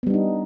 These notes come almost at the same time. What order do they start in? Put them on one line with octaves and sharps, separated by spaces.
B3 G3 D4 D#4